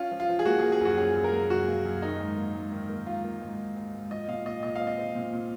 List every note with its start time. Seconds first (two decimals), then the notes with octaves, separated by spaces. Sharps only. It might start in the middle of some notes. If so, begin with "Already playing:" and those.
Already playing: C#4 F4
0.11 F3
0.20 F4
0.29 F3
0.39 G#4
0.45 A#3 F#4
0.59 A#3 G#4
0.72 G#4
0.81 F#2 F#4
0.98 C#4 G#4
1.15 F#2
1.24 A#4
1.33 A#3
1.50 F#2 F#4
1.68 A#3
1.85 F#2
2.02 D#3 D#4
2.20 G#2
2.37 A#3
2.55 G#2
2.72 D#3
2.89 A#3
3.07 G#2 F4
3.24 A#3
3.42 G#2
3.59 G#2
3.76 G#2
3.94 G#2
4.11 F3 D#5
4.28 A#2 F5
4.45 A#2 D#5
4.63 A#2 D#5
4.75 C4 F5
4.87 D#5
4.98 C4
5.15 A#2
5.32 A#2